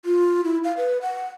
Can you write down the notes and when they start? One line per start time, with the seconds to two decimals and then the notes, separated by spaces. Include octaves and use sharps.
0.05 F4
0.44 E4
0.64 F5
0.77 B4
1.02 F#5